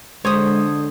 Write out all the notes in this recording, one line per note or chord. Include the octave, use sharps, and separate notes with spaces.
D3 G#3 C5 C#5 D#5 D#6